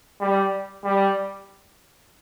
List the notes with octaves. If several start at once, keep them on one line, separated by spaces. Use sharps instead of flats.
G3
G3